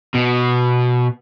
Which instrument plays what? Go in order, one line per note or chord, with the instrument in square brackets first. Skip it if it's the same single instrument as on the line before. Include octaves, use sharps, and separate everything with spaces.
[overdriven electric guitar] B2